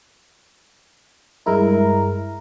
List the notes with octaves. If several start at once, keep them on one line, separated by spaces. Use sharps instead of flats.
G2 G#3 E4 A#4